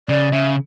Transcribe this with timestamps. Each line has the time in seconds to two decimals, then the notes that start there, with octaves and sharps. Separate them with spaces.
0.09 C#3 D5
0.32 C#3 E5